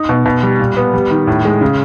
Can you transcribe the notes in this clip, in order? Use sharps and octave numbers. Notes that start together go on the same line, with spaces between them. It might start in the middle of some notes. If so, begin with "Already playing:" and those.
Already playing: D#4
B2
B2
G3
A#2
B3
G3
D#3
A2
G#3
C#3